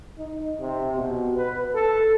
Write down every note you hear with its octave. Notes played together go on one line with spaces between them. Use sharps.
D#4
C3
B2
B4
A4